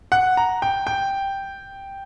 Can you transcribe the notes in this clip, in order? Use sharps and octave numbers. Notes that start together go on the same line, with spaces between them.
F#5
A#5
G5
G5